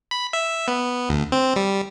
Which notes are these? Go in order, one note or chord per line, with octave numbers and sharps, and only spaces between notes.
B5
E5
B3
D2
C4
G3